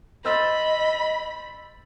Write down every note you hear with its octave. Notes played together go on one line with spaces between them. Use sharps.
C5 D#5 B5 E6 A6